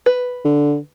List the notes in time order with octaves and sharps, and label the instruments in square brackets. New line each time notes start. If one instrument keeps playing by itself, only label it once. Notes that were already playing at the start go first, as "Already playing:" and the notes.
[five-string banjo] B4
[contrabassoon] D3